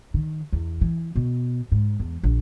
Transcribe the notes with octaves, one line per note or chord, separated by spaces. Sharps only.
D#3
E2
E3
B2
G#2
E2
A#1